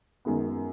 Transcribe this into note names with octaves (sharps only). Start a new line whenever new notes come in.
F#2 D#3 G#3 B3